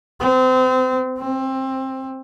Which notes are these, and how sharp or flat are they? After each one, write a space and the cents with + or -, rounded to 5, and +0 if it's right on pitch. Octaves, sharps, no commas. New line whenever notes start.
C4 -30
C4 +20